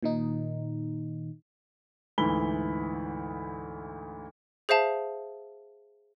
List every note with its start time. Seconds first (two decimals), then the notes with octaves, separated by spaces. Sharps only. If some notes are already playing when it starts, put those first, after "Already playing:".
0.03 A#2 D#3 D#4
2.18 D2 G#2 E3 B5 G7
4.69 G#4 C5 E5 F5 A5